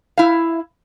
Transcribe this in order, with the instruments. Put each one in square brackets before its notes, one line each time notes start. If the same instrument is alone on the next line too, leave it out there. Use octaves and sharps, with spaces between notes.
[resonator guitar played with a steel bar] E4 F5